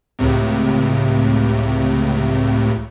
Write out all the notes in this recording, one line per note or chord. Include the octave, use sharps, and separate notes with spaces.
C#2 A2 C3